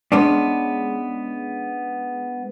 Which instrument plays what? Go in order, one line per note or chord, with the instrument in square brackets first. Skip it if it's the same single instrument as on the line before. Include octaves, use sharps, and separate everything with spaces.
[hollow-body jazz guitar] G#3 B3 C#4 D4